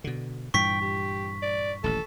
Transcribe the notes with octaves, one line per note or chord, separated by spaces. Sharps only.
B2 D3
G2 A#2 E3 G5 C#6 B6
G4
D5
D#1 A1 A4